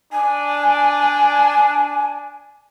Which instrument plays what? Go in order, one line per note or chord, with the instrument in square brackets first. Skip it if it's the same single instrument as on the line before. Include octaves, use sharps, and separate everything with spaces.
[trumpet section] D4 [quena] G#5